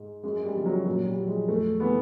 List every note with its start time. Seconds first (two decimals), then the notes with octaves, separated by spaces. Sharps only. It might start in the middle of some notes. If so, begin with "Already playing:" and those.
Already playing: G#2
0.23 F#2 G#3
0.45 G3
0.55 C#3 F3
0.66 F#3
0.86 A#2 F#3
1.07 G3
1.18 F3
1.28 G#3
1.48 F2 A3
1.80 C3 E3 B3